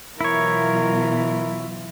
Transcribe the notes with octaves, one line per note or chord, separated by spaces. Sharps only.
B2 E3 F#3 E4 F4 A#4 C#5